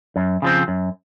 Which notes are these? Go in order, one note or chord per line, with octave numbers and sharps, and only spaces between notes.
F#2
C#3 F3 C4
F#2